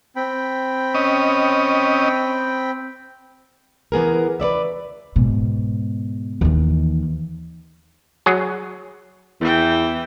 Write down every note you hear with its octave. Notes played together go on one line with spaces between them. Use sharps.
C4 G5 B5
C#4 D#5
E3 B3 G#4 A#4
B4 C#5 D5 E5
G#2 B2
D#2 E3
F#3 G#4
E2 E3 G5